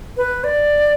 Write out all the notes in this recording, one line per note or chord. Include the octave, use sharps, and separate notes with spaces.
B4
D5